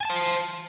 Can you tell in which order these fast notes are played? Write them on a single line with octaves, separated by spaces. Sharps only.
G#5 A5 C5